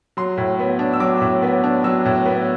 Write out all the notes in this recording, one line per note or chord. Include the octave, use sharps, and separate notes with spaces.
F#3 C6
A2
B3
D4
E6
F#3 D6
A2
B3
D4
F#3 E6
A2
B3